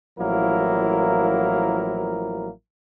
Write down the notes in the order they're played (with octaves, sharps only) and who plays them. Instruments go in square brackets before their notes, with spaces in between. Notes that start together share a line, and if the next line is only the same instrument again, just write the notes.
[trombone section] A1 F3 F#3 A#3 E4 A#4